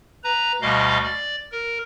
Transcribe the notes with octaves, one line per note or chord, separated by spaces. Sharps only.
B4 A#5
D2 B2 G3 D#5 F5
D5
A#4